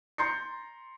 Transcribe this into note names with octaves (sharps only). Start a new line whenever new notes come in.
A#5 C6 G6 A6 C7 C#7